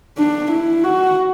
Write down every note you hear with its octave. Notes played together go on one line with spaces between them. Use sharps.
D4
E4
F#4